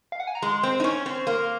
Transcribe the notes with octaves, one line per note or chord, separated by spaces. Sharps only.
F5
F#5
G#5
A#5
G#3 C6
C4
D#4
C#4 C#6
C4
A#3 C6